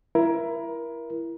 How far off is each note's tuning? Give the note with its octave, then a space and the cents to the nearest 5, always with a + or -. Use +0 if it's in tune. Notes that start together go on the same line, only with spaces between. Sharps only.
E4 +20 A#4 +25